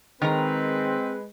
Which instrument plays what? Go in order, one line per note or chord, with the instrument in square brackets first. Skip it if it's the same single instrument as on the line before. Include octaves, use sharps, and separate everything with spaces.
[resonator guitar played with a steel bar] D#3 A#4 A#5 [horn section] G#3 B4 [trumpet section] C4